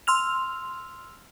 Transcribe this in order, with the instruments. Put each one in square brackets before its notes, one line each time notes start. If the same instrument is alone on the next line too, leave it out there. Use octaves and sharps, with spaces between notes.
[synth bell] C6 E6 F6 F7